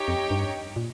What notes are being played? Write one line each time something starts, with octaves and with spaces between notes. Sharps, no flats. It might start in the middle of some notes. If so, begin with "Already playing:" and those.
Already playing: D#4 G4 C#5 G5
F2
G2
A#2